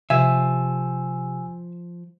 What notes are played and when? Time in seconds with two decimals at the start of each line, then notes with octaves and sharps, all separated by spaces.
0.10 C3 F3 E5 F5 G#5 E6 G#6